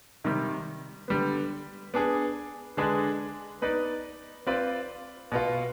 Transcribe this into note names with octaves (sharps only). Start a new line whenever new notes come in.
C3 D#3 G3
D3 G3 B3
B3 D4 G#4
D3 G#3 D4 G#4 B4
B3 D#4 B4 D5
C4 F4 B4 D5
B2 B3 F4